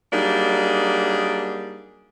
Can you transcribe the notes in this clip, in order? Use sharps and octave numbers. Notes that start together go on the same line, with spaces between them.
F#3 G3 A#3 D4 D#4 G#4